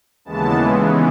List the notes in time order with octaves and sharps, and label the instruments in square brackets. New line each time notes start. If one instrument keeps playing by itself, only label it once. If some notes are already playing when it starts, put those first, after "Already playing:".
[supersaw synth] D#2 C#3 E3 G#3 B3 A5